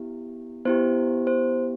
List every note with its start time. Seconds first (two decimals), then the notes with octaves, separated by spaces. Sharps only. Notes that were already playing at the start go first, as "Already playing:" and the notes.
Already playing: B3 E4 G4
0.65 B3 E4 G4 C5
1.27 C5